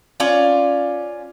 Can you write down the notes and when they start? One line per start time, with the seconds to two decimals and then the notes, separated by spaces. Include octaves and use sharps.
0.20 C#4 F4 D5